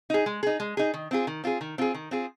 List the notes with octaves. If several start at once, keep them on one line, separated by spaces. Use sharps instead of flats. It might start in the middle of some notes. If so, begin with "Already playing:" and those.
D#4 G#4
G#3
D#4 G#4
G#3
D#4 G#4
D#3
C4 F4 G#4
D#3
C4 F4 G#4
D#3
C4 F4 G#4
D#3
C4 F4 G#4